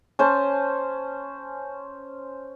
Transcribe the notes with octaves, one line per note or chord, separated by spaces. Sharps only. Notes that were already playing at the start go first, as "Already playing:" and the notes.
C#4 C5 G#5 A5